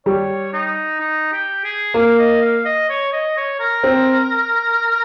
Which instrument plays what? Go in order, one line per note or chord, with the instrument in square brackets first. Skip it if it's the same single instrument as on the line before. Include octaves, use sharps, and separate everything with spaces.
[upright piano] G3 [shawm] C#5
[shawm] D#4
D#4
G4
G#4
[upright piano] A#3 [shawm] F5
[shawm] D#5
F5
D#5
C#5
D#5
C#5
A#4
[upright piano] C4